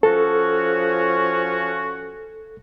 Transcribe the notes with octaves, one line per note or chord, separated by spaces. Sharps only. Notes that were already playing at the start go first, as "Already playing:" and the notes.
F3 C#4 F#4 A4